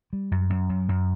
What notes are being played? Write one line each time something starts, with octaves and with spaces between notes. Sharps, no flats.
G3
F#2
F#2
F#2
F#2